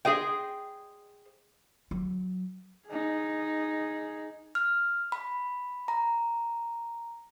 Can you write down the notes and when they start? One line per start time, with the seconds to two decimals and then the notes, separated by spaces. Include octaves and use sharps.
0.05 G#4 C5 D#5 G5
1.91 F#3
2.88 D#4 G#4
4.55 F6
5.12 B5
5.88 A#5